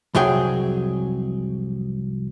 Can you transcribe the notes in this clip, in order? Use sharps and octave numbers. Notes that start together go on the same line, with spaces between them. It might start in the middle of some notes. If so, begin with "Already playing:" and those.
C2 F2 F#3 G#4 G5